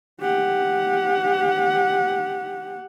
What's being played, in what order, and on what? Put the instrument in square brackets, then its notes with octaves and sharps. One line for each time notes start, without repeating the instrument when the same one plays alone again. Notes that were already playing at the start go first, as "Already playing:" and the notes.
[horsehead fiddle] G4 F#5